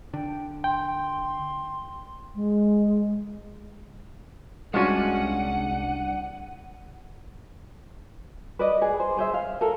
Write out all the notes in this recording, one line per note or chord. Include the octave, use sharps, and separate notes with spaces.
D3 G5
G5 C6
G#3
C2 G#3 C#4 D4 F4 F#4 F#5 D#7
B4 D5 D#5
G#4
C5
G#4 C5 E5
F5
A4 A#4